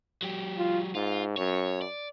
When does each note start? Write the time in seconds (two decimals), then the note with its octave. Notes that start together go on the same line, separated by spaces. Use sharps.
0.23 F#3 G4
0.58 F4
0.95 G#2 F4
1.37 F#2 C#5
1.82 D5